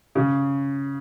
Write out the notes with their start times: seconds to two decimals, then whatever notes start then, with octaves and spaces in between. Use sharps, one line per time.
0.15 C#3